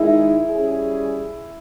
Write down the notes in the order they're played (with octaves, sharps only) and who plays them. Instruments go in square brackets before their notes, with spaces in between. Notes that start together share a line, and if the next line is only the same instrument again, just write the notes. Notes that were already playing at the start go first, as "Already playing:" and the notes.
Already playing: [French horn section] D#3 G#3 D#4 G#4 [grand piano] E4
[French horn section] G3 C#4 G#4